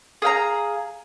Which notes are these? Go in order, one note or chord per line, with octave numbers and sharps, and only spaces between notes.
G#4 F5 G5 A#5